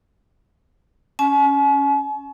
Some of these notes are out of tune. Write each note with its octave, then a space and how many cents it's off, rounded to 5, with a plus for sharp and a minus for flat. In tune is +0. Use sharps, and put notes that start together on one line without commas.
C#4 +0 G#5 +45